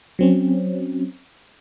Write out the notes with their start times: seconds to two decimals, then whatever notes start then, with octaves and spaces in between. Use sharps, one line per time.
0.19 F#3 C4 C#4